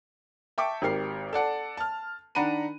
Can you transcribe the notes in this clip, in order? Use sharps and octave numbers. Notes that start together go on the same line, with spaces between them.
E5 G5 A5 C#6 D6
G#1 G4 A#4 C7
A4 D5 F#5 A5
A5 F6
D#3 D4 F#5 A#5 B5 D#7